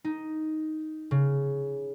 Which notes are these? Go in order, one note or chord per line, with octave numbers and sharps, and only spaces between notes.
D#4
C#3